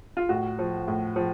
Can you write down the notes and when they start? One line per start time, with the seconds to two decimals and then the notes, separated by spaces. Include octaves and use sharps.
0.17 F4
0.29 A2 F#4
0.59 F3
0.88 A2
1.16 F3